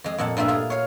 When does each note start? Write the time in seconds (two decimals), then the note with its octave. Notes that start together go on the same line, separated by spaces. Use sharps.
0.04 F2 G#3
0.18 F2 A#2 F#5 A5
0.37 G2 A#2 A3 F4 E5
0.48 F4 G#4
0.70 C#5 F5